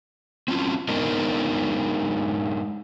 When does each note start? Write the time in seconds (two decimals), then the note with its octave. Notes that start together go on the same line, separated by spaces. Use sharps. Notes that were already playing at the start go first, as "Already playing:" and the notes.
0.48 C4 C#4 F4
0.89 G#3 B3 D4 D#4 A#4 D#5